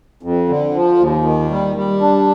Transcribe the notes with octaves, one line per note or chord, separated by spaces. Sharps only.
F2
D3
F3
D#2
D#3
G3
G3
D4